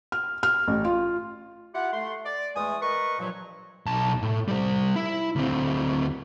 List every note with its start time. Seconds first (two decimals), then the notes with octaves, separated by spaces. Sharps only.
0.12 F6
0.43 F6
0.68 A1
0.85 F4
1.74 E4 F4 G4 F#5
1.93 A3 C6
2.25 D5
2.56 E2 G#3 A3 G#5 D#6
2.82 A#4 B4 D#5 C#6
3.19 G2 A#2 F3 F#3
3.86 B1 A5
4.22 A2
4.48 G3 C5
4.96 E4
5.36 D2 C4